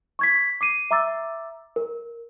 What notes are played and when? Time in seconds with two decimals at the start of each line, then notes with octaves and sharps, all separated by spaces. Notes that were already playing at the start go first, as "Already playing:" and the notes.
0.19 C#6 G#6 B6
0.61 D6 C7 D#7
0.91 E5 A#5 D6 E6 A6
1.76 A#4